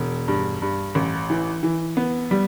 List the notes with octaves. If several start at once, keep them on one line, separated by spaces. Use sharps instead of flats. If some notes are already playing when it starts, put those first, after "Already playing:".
Already playing: E1
G2
G2
A1
E3
E3
B3
G3